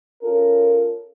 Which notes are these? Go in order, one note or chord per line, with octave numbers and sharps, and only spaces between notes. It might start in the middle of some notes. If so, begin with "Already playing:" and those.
C#4 F4 A4 A#4